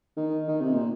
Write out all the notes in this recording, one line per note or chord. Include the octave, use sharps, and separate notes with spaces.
D#3
D#3
C3
A#2